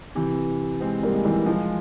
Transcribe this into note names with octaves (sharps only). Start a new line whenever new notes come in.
C3 E3
G#3 C4
G3 A#3
G#3
E3 G3
F3 G#3